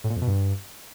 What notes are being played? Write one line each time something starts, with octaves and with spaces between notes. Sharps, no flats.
A2
A#2
F2
B2
G2